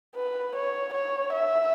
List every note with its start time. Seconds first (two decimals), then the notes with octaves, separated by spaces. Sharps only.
0.16 B4
0.55 C#5
0.94 C#5
1.33 E5